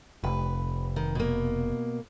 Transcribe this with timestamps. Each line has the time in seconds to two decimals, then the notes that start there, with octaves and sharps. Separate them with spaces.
0.24 F1 B4
0.96 D#3
1.15 B2 A#3